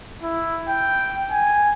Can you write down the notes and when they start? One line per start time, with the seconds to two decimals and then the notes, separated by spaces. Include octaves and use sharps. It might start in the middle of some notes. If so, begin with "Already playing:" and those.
0.23 E4
0.69 G5
1.32 G#5